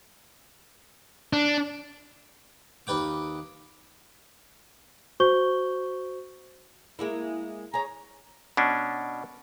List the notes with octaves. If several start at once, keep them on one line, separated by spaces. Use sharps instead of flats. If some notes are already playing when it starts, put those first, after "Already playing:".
D4
D#2 B4 G5 D6
F#4 C5 C#6 G6 G7
G#3 A#3 E4
G#4 C#5 A#5
B2 C#4 D4